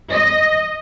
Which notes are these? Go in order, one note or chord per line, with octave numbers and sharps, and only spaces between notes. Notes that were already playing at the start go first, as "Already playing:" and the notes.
D#5